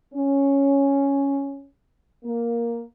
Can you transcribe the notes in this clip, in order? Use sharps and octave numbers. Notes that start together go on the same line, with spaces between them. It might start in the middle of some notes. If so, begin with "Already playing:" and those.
C#4
A#3